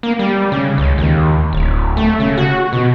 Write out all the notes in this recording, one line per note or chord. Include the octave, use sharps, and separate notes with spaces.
A#3
G3
C#3
C#2
D#2
D1
A3
C#3
F#4
B2